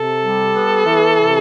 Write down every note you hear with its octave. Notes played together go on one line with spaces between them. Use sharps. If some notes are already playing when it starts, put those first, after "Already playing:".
Already playing: C3 A4
G3
B3
E3
C3